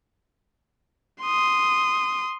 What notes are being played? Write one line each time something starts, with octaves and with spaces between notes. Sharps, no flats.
C6 D#6